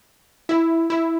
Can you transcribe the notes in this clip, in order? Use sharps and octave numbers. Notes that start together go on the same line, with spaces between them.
E4
E4